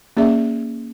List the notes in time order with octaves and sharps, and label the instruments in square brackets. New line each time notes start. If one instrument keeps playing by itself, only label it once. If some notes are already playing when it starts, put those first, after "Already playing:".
[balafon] A#3 C#4 G#4 D5 E5